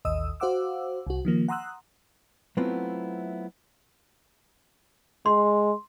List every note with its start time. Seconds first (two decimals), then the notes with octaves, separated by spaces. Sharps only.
0.05 A1 D#2 D#5 D#6 E6
0.40 F#4 C5 F5 F#5 D6 E6
1.07 C2 F#4
1.25 D#3 F3 A#3
1.48 F#5 A#5 C6 D#6 E6 F#6
2.57 F#3 A3 B3 C4 E4 F4
5.26 G#3 C6